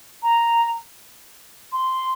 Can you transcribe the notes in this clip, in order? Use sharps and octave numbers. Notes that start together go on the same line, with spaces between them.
A#5
C6